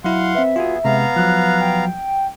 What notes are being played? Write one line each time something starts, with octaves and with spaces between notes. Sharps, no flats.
F#3 E4 F5 F#5 C6
C4 B4 E5
B3 F4 F#4 G#4
C3 G#3 B3 F5 A#5
F3 F#3 F#6
G5